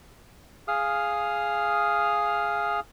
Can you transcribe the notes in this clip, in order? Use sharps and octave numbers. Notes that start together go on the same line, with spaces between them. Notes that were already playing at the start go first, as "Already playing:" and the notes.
G#4 F5 D#6 F6